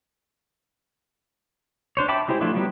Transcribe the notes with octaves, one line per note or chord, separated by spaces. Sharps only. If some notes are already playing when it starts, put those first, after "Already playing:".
D4 C5 C#5
E5 G5 A5 B5 D6
G#3 E4 G4 C5
F3 A3 D4 E4 F4
F#3 G3 B3 D4 G4